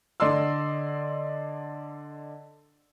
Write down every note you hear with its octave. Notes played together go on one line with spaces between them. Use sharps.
D3 D5 D#5 C6 E6